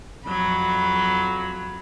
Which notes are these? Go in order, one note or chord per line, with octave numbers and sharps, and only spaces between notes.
F2 F#3 B5